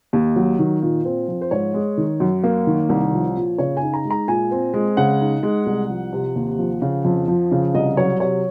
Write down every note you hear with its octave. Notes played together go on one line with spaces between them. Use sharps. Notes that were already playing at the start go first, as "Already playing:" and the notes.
D#2
F#3
D#3
A#2
C4
F3
C5
G#2 C#5
G#3
D#3
F#2
A#3
D#3
C2
F3
A#2
C#3 C#5
G#5
D#4
A#5
G#3
A#5
A#2 G#5
C4
G#3
C#3 F#5
D#4
G#3
C2
F3
C3
D#2
F3
C#3
F2
F3
C#3
C2 D#5
F#3 C#5
C3 C#5